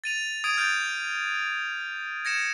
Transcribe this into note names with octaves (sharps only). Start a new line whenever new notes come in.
A6 D#7 F7
D#6 G#6 D7 D#7 F7
D#6 F6 G6 A6 D7
G#6 A#6 C#7 E7